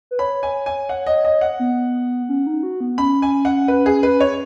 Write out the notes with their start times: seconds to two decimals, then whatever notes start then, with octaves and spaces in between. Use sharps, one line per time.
0.11 B4
0.19 C#5 B5
0.43 G#5
0.66 G#5
0.89 F#5
1.06 D#5
1.24 D#5
1.41 F#5
1.60 B3
2.29 C#4
2.47 D#4
2.63 F#4
2.80 B3
2.98 C#4 B5
3.22 G#5
3.45 F#5
3.68 B4
3.86 G#4
4.03 B4
4.20 C#5